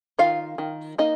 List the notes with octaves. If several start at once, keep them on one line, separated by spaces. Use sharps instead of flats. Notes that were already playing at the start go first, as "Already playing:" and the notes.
D#3 F4 F5
D#3
A#3 D#4 D#5